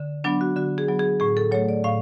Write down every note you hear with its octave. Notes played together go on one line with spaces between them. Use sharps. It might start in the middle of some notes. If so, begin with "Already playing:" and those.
Already playing: D3
F#3 B3 D4
F#4
D3 F#4
G#4
F#3 B3
G#4
A2 G#4
A4
F#3 A3 C#5
D5
A2 F5